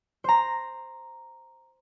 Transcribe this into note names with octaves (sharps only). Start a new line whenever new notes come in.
C5 A#5